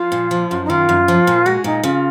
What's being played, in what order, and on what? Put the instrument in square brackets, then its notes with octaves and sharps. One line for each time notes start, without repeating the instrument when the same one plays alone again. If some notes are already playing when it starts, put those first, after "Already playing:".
Already playing: [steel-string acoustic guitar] F3 [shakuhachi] F4
[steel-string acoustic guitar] A#2
F3
F#2
[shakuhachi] D#4
[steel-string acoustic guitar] D#3 [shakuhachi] F4
[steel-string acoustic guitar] F#2
F3
A#2
[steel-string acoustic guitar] G#3 [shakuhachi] F#4
[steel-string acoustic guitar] A#2 [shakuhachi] D#4
[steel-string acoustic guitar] C#3 [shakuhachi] F4